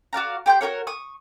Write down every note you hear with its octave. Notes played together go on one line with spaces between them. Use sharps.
F#4 D5 F5 A#5
G4 G5 C6 G6
F#4 G4 A#4 C#5
C#6 D#6